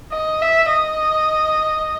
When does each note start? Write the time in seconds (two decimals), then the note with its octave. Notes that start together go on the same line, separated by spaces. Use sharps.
0.12 D#5
0.42 E5
0.72 D#5